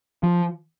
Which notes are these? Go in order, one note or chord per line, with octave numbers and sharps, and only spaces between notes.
F3